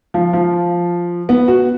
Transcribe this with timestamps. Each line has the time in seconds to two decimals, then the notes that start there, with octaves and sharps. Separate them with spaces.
0.14 F3
0.33 F3
1.29 B3
1.48 F#4